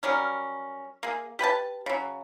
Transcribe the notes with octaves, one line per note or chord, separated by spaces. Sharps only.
F#3 G3 C#4 A#4
A#3 G#4
G4 B4 G5 A5
C#3 F#3